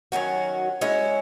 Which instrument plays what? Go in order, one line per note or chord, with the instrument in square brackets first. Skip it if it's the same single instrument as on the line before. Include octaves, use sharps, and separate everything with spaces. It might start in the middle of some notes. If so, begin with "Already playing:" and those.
[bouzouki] D#3 F#3 C#4 F#4
G#3 C#4 E4